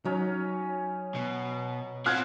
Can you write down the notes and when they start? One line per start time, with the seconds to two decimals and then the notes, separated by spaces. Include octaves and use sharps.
0.05 F#3 C#4 D#4
1.15 B2
2.06 C4 F4 F#4 F6 F#6 G#6